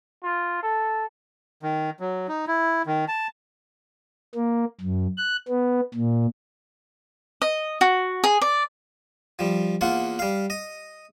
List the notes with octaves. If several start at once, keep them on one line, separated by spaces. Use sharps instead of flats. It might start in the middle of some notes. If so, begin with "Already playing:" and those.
F4
A4
D#3
F#3
D#4
E4
D#3
A5
A#3
F#2
F#6
B3
A#2
D#5
F#4
G#4
D5
F3 G3
E2 A#3 F4 F#5
G3 F5
D#5